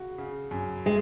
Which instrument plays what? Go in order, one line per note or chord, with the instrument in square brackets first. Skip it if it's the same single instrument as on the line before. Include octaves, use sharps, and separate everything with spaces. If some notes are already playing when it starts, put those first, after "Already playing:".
Already playing: [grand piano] C#3 F#4
C#3
F#2
[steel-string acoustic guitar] G#3